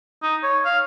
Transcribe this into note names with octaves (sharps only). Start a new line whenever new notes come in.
D#4
C#5
F5